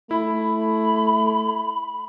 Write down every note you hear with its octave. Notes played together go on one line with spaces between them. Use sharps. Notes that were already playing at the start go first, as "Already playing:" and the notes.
A3 E4 B5